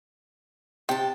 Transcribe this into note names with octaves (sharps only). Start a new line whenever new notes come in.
C3 G5 A5